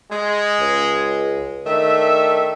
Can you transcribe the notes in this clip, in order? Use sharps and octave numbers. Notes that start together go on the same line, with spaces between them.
G#3
C#2
D#3 A3 D4 E5